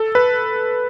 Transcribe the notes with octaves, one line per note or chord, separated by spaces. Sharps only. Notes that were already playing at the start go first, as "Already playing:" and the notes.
Already playing: A4
B4